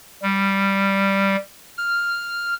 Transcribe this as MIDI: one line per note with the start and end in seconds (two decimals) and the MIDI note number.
0.23 1.36 55
1.77 2.54 89